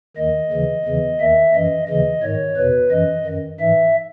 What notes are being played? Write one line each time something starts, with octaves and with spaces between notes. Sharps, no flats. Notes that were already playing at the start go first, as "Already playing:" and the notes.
D#2 D#3 D#5
D#2 C#3 E3
E2 C#3 E3
D#2 D#3 E5
F#2 E3 D#5
D#2 C#3 E3 D#5
G#2 D#3 C#5
E2 B2 B4
F#2 E3 D#5
F#2 D#3
G#2 E3 E5